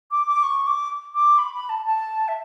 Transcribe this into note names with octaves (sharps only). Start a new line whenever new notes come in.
D6
D6
C#6
D6
D6
B5
B5
A5
A5
E5